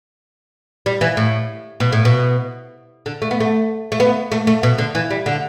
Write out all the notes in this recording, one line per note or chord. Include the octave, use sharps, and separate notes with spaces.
G3
E3
A2
B2
A2
B2
D3
A3
B3
A3
A3
B3
A3
A3
B2
D3
E3
G3
D3